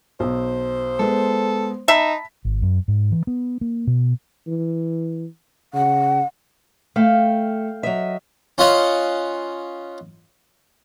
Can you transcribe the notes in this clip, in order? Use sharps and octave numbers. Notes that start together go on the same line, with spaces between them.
B1 C5
G#3 B3 A4
D#4 E5 A5 B5 B6
G#1
F#2
G#2
E3
B3
A#3
B2
E3
C#3 F#5
A3 F5 G5
F#3 D#5 E5
C#4 F4 D#5 F5 F#5